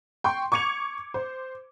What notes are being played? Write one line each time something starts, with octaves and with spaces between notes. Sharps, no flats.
G5 C6 C#6
C#6 D6 G#6 C#7 F7
C5